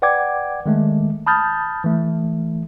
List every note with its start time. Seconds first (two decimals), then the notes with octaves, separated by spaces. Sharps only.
0.02 B4 D5 F#5 G5 D6 G#6
0.66 D#3 G#3 A3
1.26 A5 B5 D#6 F6 G6 A6
1.84 E3 A3